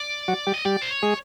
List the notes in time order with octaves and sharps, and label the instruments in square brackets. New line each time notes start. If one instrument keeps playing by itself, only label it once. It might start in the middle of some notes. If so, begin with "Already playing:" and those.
Already playing: [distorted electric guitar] D5
[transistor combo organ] F#3 F#4
G3 G4
[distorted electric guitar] D#5
[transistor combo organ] G3 G4 [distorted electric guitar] D5
[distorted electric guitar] C5
C#5
[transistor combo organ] G#3 G#4